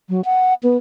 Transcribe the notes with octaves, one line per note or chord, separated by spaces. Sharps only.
F#3
F#5
B3